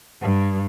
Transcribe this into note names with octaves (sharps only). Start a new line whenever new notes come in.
G2